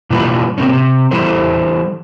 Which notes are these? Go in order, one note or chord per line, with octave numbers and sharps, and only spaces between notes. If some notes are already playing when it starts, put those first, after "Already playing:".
B2 E3 G3 A#3 F4 B4
C3 A#3 C4 C#4
C3
E3 G3 E4 A4 C5